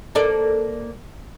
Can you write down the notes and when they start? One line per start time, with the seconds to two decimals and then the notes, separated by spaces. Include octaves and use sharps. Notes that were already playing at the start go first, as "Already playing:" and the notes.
0.15 A#3 A4 D5